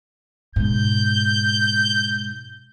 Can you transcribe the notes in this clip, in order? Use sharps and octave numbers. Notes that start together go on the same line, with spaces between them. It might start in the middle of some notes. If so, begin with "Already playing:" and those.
G#2 B2 G6